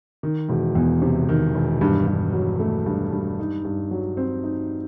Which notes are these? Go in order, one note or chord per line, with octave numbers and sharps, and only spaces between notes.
D#3
E1
E2
C3
D#3
E1
G2
G2
F#3
A3
G2
G2
D#4
G2
F#3
C4
D#4